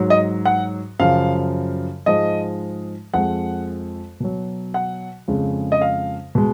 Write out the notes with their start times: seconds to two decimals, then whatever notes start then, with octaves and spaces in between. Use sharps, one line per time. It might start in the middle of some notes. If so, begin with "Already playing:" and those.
Already playing: G#2 F#3
0.10 D#5
0.45 F#5
0.99 F#2 C#3 F3 F5
2.06 G#2 F3 G#3 D#5
3.13 F2 F3 G#3 F#5
4.20 B2 F#3
4.74 F#5
5.28 F2 C#3 G#3
5.72 D#5
5.81 F5
6.35 B2 G#3